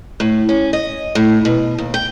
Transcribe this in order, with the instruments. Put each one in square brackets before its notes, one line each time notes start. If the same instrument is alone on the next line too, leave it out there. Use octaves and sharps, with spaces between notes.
[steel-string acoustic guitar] A2
C#4
D#5
A2
B2
D#2
G5